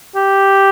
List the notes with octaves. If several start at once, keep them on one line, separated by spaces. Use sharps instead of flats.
G4